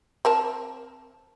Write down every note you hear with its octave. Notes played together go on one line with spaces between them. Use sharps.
C4 A#4 A5